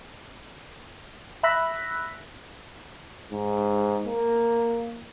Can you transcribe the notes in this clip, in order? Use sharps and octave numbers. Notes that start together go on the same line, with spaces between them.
E5 B5 E6 F#6 A#6 B6
G#2
A#3